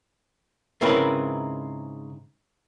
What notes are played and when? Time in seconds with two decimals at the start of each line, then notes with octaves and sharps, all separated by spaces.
0.81 G#2 C#3 C4 E4 A#4 B4